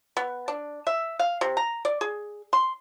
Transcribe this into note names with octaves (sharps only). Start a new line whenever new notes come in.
B3
D4
E5
F5
C3
A#5
D5
G#4
C6